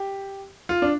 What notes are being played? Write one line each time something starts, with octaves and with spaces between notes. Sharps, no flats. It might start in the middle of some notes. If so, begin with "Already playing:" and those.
Already playing: G4
F4
D4